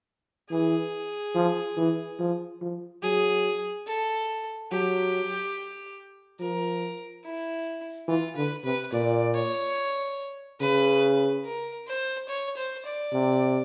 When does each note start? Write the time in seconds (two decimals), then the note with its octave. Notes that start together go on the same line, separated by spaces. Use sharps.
0.50 E3 G#4
1.35 F3
1.77 E3
2.19 F3
2.62 F3
3.03 F#3 G#4
3.87 A4
4.72 F#3 G4
6.40 F3 A#4
7.25 E4
8.08 E3 F4
8.36 D3 B4
8.65 C3 B4
8.93 A#2 D5
9.35 C#5
10.61 C#3 B4
11.45 A#4
11.88 C5
12.29 C#5
12.57 C5
12.86 D5
13.13 C3